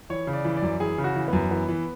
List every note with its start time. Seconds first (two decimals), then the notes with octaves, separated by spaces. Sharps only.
0.10 E3 C#5
0.27 C#3
0.33 D5
0.44 E3
0.57 D5
0.62 F#2
0.80 E3 G#4
0.98 C#3
1.04 F#4
1.16 E3
1.28 F#2 B3
1.51 E3 B3
1.69 E3